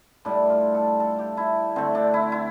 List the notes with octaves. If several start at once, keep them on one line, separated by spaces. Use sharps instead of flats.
A2 G3 D4
F4
A4
A4
G4
E4
D3 A3 C4
D4
E4
E4